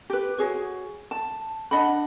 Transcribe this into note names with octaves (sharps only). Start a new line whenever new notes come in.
G4 B4
F#4 G#4 C#5
A5
D4 D#5 F#5 B5